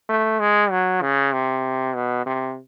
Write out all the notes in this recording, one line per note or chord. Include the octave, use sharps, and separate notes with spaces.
A3
G#3
F#3
C#3
C3
B2
C3